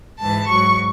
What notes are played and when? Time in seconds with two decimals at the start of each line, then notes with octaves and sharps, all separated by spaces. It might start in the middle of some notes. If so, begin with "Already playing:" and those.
0.19 G#2 E3 A5
0.47 G#2 F#3 C#6